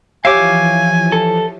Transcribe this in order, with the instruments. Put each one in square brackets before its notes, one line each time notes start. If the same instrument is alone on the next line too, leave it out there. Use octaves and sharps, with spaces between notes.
[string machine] E3 F3 [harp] G4 C#5 E5 [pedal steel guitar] F5 D6 [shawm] G#5
[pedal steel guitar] A4